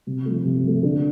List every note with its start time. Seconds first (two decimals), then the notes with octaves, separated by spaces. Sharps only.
0.07 C3
0.26 F3 A3
0.44 C3
0.65 F3 A3
0.83 D3